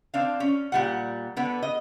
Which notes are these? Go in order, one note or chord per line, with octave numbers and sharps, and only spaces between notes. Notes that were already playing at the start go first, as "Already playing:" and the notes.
C4 D4 F5
C#4
A#2 G3 F#5
D3 B3
D#5